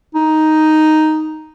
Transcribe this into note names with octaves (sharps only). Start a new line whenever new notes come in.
D#4